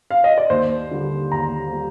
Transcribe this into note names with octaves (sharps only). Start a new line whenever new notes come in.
F5
D#5
D5
D#2 C5
D3 G3
D#2 A#5
G3